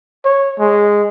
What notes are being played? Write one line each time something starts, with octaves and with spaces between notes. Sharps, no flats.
C#5
G#3